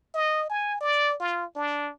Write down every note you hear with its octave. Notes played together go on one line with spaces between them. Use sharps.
D#5
G#5
D5
F4
D4